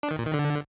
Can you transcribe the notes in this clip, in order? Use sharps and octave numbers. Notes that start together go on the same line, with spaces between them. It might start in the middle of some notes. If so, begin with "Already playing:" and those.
D4
D#3
A#2
D#3
D3